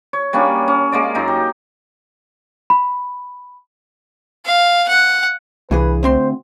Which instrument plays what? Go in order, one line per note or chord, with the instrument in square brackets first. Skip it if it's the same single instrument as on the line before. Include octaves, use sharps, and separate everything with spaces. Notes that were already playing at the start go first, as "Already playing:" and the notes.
[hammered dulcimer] C#5
G3 A#3 C#4 D4
C#4
G#3 A#3 D5
F#2 D#4 A#5
G4
[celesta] B5
[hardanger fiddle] F5
F#5
[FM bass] C2 [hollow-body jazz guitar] G2 E3 G#4 [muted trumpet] B4
[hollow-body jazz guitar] D2 C4 C6 [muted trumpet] C5